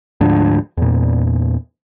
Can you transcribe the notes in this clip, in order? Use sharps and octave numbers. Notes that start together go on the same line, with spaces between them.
D2 G#2 F3 D4
E2 A#2